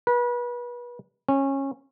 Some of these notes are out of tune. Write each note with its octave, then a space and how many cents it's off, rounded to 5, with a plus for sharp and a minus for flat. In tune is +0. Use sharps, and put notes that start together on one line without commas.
B4 -30
C#4 -20